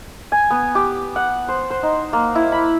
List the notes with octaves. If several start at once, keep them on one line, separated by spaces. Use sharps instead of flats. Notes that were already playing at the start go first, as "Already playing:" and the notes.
G#5
B3
G4
F#5
C5
C5
D#4
A#3
E4
B5